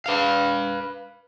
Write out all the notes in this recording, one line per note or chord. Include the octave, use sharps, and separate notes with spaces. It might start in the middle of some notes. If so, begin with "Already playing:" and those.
B4 F5